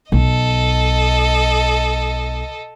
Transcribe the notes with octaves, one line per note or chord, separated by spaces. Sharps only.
B1 A4 D#5